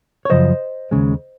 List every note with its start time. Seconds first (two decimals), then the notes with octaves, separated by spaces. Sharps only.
0.25 C#5
0.30 F#2 C#3 F3 C5 D#5
0.91 D#2 C#3 G#3